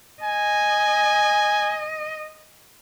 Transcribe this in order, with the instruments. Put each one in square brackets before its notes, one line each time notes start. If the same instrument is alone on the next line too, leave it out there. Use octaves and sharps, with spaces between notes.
[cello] D#5 [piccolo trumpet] G#5